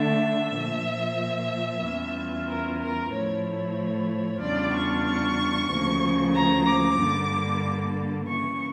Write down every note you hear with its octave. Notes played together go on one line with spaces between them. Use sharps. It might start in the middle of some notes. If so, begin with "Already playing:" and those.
Already playing: D3 A3 D4 E5
A#2 F3 A#3
E2 E3 G3 C#4 F4
A#4
A#4
A2 F3 A3 E4 C#5
C#5
E2 C#3 G3 D4 F4 D5
C#6
C#6
D2 C#3 F3 A#3
A#5
D6
G2 D3 G3 A#3
C#3 E3 A#3 C#6